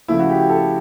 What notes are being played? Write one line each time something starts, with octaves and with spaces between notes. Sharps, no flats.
C#3 F3 A3 E4
F#4
G4
G4
A4